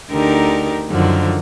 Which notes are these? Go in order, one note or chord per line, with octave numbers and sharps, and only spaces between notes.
D2 D3 D#4 G4 A#4
F#2 D3 D#3 F3